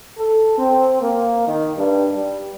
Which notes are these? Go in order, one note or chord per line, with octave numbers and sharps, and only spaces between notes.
A4
C4
A#3
D#3
G2
G3